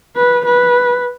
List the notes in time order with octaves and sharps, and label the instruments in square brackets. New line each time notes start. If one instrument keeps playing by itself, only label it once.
[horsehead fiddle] B4
B4